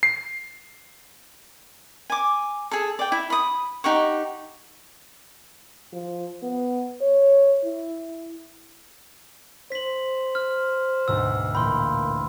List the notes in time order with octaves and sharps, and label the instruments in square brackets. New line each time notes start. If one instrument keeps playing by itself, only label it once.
[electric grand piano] C7
[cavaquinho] G#5 D6
G#4 A4
D5 G5
E4
B5 D#6
D#4 G4 F#5 C#6
[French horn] F3
B3
C#5
E4
[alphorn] C5 [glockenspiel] B6 F#7
[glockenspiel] F6
[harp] D2 G#2 B2 [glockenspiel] E6
[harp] A1 A#2 G5 [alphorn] A#3 [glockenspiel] B5 C6